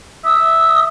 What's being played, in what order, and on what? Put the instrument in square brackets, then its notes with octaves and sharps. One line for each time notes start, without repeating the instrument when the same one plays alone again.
[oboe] E5 [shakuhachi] D#6